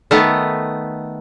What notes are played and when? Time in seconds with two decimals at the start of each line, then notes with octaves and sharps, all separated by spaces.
0.11 D#3 A3 B3